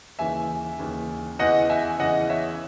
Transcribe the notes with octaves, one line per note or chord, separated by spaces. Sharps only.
D#2 C#3 E3 E5 G#5
D#2 C#3 E3
E2 C#3 E3 D#5 F#5
E5 G#5
E2 C#3 E3 D#5 F#5
C#5 E5